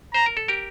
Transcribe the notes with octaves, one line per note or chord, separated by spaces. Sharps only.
C5 A#5
A#4
A4
G4 A#4